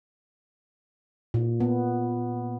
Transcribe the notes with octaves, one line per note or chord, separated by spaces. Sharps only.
A#2
B3